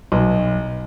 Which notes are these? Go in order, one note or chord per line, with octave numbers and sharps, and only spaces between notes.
B1